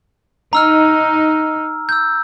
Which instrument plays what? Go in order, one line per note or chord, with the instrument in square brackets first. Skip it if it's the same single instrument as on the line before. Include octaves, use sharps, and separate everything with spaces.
[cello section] D#4 [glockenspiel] A#5 E6 F6
[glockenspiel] E6 G6